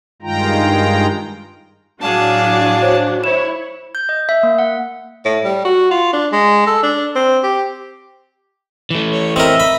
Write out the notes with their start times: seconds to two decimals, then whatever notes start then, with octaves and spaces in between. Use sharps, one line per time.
0.22 G2 D#3 G#3 F4 G5 A#5
2.02 A2 F#3 D4 F#4 G#4 F5 A5
2.82 C5 C#5
3.24 E4 C5 C#5 E7
3.95 G6
4.09 D#5
4.29 E5
4.43 A#3
4.58 F#5
5.25 A2
5.44 G3
5.65 F#4
5.91 F4
6.13 D4
6.32 G#3
6.67 A4
6.83 D4
7.16 C4
7.43 G4
8.91 E3 A3
9.11 C#5
9.36 C4 A#4 D#5 E5
9.60 B5